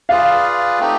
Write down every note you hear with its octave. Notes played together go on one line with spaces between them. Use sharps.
F4 G#4 B4 D5 F5
A3 C4 D#4 G4